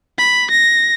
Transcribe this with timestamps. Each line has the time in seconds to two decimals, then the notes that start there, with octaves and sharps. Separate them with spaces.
0.18 B5
0.51 A#6